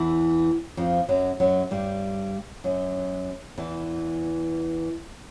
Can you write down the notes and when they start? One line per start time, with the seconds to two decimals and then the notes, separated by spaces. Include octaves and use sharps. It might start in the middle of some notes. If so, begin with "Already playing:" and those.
Already playing: E2 E3
0.77 F2 F3
1.08 F#2 F#3
1.40 F#2 F#3
1.71 G2 G3
2.64 F#2 F#3
3.58 E2 E3